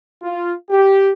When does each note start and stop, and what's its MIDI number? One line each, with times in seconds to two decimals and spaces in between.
0.22 0.53 65
0.70 1.12 67